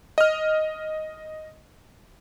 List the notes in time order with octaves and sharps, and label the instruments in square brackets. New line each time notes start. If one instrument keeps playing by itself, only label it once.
[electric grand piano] D#5 F6